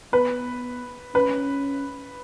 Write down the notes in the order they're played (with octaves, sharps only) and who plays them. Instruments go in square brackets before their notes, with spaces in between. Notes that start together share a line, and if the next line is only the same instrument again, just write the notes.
[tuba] B3 [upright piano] B4
[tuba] C#4 [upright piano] B4